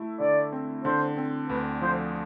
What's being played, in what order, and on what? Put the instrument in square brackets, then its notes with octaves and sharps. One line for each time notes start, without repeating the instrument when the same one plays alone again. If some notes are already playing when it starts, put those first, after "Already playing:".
Already playing: [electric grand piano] A3 E4
[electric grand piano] D3 [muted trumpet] D5
[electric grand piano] C4
[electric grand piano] D3 [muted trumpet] C5
[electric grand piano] C4
[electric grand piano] D2 [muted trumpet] B4
[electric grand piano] F3 [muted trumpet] C5